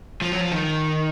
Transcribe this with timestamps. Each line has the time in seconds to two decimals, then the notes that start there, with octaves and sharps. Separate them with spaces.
0.22 F3
0.32 F#3
0.40 F3
0.52 D#3